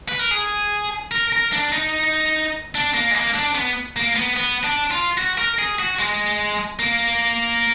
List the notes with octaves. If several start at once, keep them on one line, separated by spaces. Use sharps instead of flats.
B4
A#4
G#4
A#4
A#4
D4
D#4
D4
A#3
G#3
A#3
D4
B3
A#3
B3
B3
D4
F4
F#4
A#4
G#4
F#4
G#3
A#3